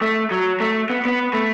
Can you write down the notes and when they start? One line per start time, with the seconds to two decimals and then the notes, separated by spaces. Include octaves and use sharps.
0.02 A3
0.31 F#3
0.60 A3
0.90 B3
1.05 B3
1.33 A3